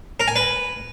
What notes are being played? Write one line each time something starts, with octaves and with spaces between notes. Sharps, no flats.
A#4
G#5
B4